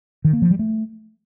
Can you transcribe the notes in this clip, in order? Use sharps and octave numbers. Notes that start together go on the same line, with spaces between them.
D#3
A#3
F3
G3
A3